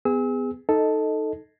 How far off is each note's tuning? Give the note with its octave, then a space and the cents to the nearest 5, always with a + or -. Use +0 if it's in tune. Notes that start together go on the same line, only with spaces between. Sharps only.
B3 +25 G#4 -20 E6 -35
D#4 +0 A4 +0 D#5 +10